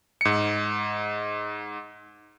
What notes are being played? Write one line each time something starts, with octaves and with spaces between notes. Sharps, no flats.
G#2 C#7